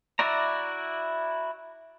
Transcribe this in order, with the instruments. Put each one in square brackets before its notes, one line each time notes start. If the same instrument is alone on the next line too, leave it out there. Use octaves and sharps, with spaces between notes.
[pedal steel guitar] E4 F#4 D5 A#5